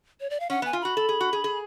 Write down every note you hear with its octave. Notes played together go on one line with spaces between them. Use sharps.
C#5
D5
F5
C#4 F#5
B3
G#5
F4
F#4 B5
A4
G#4
F#4
G#4
G#4